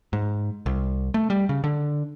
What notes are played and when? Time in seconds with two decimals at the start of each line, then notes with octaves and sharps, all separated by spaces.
0.13 G#2
0.66 C2
1.14 A3
1.30 G3
1.49 C#3
1.64 D3